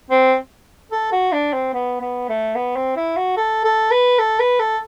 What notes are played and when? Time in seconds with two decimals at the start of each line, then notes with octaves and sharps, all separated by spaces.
0.10 C4
0.92 A4
1.12 F#4
1.32 D4
1.53 C4
1.73 B3
2.01 B3
2.29 A3
2.55 B3
2.76 C4
2.96 E4
3.17 F#4
3.37 A4
3.64 A4
3.91 B4
4.19 A4
4.39 B4
4.60 A4